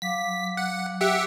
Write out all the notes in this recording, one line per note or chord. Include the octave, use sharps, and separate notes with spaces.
F#3 F5 D6 B6
F#5
G4 E5 F#5